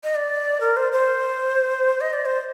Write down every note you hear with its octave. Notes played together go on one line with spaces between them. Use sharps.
D#5
D5
A#4
C5
C5
D#5
D5
C5